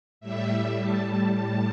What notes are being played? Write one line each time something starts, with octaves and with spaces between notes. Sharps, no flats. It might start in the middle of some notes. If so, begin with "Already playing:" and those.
A2 G3 E5
A5
A5